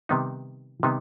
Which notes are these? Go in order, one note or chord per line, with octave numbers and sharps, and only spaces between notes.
C3 D#3 G3 B3 D#4
C3 D#3 G3 B3 D#4